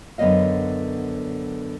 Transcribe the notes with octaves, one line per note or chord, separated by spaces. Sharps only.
F#2 D3 B3 C#5 D#5 F5